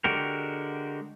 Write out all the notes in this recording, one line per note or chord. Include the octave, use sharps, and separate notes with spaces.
D3 G#3 F#4 G4 A#4